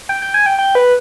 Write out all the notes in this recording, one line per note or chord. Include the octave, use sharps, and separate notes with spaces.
G5
G5
G#5
G5
G5
B4